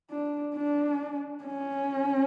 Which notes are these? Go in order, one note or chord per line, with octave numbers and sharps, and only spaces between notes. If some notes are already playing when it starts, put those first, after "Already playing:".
D4
D4
C#4